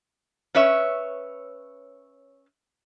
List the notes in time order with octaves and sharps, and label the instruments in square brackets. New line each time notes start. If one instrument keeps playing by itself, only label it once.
[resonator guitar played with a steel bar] C#4 B4 C#5 E5